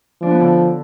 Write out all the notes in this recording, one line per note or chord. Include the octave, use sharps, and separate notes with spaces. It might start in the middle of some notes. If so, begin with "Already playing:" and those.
F3 D4
B3
D3 D4